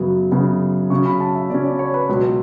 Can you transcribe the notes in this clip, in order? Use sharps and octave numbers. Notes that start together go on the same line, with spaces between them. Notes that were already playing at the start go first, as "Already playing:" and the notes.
Already playing: F#2 C#3 F#3 B3
F#2 C#3 F#3 B3
C#3 F#3 C#4 C#6
B5
A5
E5
C#3 F#3 C#4 D5
D5
C#5
B4
C#2 B2 F#3